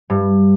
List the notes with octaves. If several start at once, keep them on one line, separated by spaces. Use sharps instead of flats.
G2